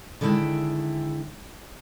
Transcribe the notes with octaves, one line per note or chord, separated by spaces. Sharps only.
D3 D#3 G#3 E4 G5